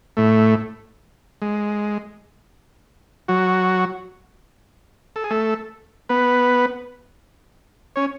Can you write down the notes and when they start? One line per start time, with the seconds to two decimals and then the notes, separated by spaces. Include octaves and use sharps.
0.17 A2 A3
1.42 G#3
3.28 F#3 F#4
5.16 A4
5.24 G#4
5.31 A3 A4
6.09 B3 B4
7.96 C#4 C#5